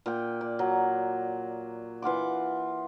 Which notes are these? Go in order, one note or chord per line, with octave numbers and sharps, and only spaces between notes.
A#2 G5
D5
F#3
E3 F4 F#5 D6